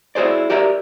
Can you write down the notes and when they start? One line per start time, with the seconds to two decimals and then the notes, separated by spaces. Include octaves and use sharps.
0.15 E4 F#4 G#4 C5 D5
0.50 F#4 G4 A#4 D5 E5